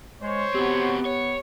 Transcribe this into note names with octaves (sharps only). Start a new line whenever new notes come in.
G#3 C5 C#5
B3 C4 F#4 G4
C#5